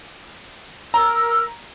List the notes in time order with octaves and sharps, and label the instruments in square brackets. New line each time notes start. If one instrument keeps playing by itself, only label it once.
[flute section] A#4 E6 [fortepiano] A#5